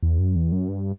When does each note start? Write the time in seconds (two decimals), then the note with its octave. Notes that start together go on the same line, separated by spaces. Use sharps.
0.02 E2
0.19 F#2
0.36 E2
0.52 F#2
0.69 G2